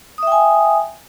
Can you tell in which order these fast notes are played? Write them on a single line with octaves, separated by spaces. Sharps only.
D#6 E5 G5 G#5